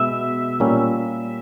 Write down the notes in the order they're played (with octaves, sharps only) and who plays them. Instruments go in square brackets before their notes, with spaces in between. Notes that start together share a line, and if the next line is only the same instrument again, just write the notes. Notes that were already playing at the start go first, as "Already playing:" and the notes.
Already playing: [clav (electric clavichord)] B2 G#3 B3 [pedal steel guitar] E5
[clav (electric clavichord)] A#2 G3 A#3 C#4